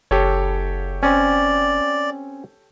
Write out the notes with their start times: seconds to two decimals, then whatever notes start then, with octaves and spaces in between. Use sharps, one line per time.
0.11 F#1 G4 A4 C#5
1.03 C4 C#4 D5